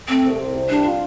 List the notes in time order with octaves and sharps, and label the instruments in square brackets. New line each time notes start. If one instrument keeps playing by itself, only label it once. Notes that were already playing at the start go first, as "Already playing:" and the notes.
[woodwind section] A3 [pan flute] C4
[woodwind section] C2
C3
C2
[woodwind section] G3 [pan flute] D4
[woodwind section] F4